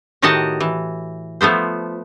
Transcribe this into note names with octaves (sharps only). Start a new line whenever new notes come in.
A2 D#3 F#4 G4 D#5 A5
E3
F3 A3 B3 C5